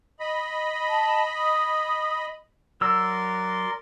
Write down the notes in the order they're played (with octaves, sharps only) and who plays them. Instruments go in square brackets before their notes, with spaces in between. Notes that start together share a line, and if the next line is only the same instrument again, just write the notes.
[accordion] D#5 B5
[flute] A5
D#6
[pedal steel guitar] F#3 E6 [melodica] A#4 D5 C6